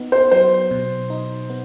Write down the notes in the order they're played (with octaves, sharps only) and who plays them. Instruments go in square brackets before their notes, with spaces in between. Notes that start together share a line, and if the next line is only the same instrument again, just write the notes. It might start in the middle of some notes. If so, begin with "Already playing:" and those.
Already playing: [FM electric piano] B3 D#4
[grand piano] C5
[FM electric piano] F#3 [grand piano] C5
[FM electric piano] B2
D#4
B3